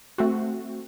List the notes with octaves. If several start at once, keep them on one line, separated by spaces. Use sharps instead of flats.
A3 C4 F#4